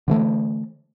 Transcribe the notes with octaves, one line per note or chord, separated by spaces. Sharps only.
D3 E3 A3